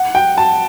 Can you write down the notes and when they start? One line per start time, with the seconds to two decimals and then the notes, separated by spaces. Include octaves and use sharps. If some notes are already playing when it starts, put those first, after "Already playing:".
Already playing: F#5
0.15 G5
0.38 A5